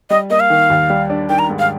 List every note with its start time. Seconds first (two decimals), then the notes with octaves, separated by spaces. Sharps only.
0.10 G3 D#5
0.30 A#3 D#5
0.40 F5
0.50 D#3
0.70 D#2
0.90 G3
1.10 D4
1.29 D#3 G5
1.39 A#5
1.49 G#2
1.59 F5